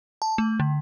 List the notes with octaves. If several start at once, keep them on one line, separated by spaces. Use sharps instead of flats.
A5
A3
D3